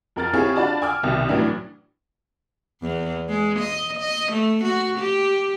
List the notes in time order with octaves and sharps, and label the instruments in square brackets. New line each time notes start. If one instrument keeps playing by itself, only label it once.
[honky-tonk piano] F2 A#4 F6 A6
C4 E4 F4 G4 G#4 C#5
D4 F4 F#4 D5 A5 B5
G#5 D6 E6 F6
C2 B2 D#3 G3
A2 E3 F#3 C#4 D4
[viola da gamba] E2
G#3
D#5
D#5
A3
F#4
G4